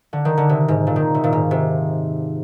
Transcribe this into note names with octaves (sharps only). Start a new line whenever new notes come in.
D3
D#3
D3
C3
G#2
A#2
D#3
C3
A#2
G#2
C3